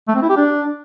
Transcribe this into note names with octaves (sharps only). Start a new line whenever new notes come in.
A3
C4
E4
G4
D4